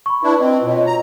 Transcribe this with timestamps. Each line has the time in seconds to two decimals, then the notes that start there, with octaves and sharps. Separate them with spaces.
0.06 B5 C#6
0.23 D4 E4 B4
0.40 C4 D#5
0.63 B2 F4 C#5 D#5
0.87 A#5